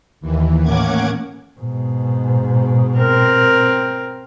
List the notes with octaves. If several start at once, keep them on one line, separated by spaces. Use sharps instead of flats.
D#2 E3
A2 A#3 C#4 F#5 D6 G#6
G#2 B2
C4 A#4